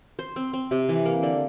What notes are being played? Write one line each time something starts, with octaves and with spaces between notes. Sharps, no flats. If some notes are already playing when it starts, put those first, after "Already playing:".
C5
C4
C4
C3
E3
A#3
D3